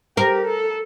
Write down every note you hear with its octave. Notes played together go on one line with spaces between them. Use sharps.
G4 A#4
A4